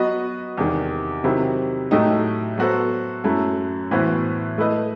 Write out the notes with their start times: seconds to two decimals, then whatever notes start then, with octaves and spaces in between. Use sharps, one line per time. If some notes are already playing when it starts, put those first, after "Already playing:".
Already playing: F#3 B3 F#4 B4 D#5
0.57 E2 C3 D#3
1.24 C3 D#3 F#3 C4 E4
1.91 A2 F#3 A3 D#4 G4
2.58 F#3 B3 F#4 A4 C5
3.24 F#2 F#3 A3 E4
3.91 A2 E3 B3 F#4 C5
4.58 A3 E4 B4 D#5